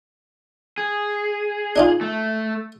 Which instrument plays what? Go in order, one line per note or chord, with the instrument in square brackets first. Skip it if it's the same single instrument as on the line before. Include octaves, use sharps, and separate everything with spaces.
[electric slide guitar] G#4
[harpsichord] D4 D#4 F4
[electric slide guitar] A3